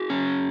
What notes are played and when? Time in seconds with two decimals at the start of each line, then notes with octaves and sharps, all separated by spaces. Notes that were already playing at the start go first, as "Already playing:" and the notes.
Already playing: F#4 G#4
0.10 C#4